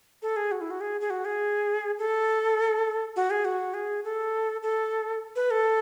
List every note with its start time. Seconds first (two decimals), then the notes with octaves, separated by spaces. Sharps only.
0.22 A4
0.36 G#4
0.52 F#4
0.61 E4
0.71 F#4
0.81 G#4
1.01 G#4
1.10 F#4
1.25 G#4
1.99 A4
3.16 F#4
3.30 G#4
3.45 F#4
3.74 G#4
4.04 A4
4.63 A4
5.36 B4
5.51 A4